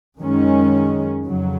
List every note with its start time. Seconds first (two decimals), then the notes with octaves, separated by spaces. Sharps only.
0.18 F#2 D#3 G#3 C#4
1.25 F2 C#3 F#3